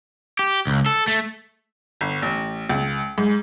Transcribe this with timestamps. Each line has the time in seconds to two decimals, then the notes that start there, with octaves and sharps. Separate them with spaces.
0.39 G4
0.67 C#2
0.86 A4
1.08 A3
2.01 G1
2.22 A1
2.69 C#2
3.18 G#2